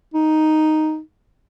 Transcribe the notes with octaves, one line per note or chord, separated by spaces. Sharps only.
D#4